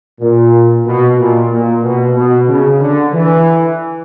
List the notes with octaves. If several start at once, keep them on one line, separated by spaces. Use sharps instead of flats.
A#2
B2
A#2
A#2
B2
B2
C#3
D3
E3